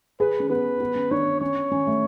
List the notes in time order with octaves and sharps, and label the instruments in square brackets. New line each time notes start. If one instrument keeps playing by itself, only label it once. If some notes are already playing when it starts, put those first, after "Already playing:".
[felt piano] G#4 [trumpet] B4
[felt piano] C#4
[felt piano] B3 [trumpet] B4
[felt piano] B3
C#4
[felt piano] D4 [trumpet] C#5
[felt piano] C#4 [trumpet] C#5
[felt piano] C#4
A3